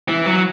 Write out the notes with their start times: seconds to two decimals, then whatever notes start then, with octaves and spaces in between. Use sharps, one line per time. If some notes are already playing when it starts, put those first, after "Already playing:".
0.08 E3
0.26 F#3